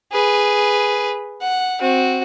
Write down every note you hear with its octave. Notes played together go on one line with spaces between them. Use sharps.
G#4 B4
F#5
C4 F#4